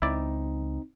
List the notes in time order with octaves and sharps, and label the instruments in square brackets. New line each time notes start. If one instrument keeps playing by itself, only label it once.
[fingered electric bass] C#2 [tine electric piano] C4 D#4 [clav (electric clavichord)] E4 D5